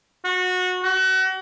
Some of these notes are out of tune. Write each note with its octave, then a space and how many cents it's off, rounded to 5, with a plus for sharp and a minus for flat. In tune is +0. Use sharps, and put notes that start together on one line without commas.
F#4 -20
F#4 +35